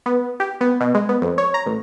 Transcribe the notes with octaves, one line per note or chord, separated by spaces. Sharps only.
B3
G4
B3
B2
G#3
B3
F2
C#5
A#5
A1